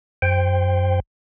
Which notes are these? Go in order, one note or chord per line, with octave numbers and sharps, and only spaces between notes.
F#2 C5 G5